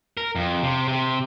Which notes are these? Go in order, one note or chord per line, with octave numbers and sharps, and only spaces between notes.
A#4
F2
C3
C3